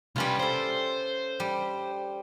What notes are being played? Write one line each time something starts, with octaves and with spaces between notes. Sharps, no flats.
C2 G3 C#4 F4 B4
F4 A4 C5
G3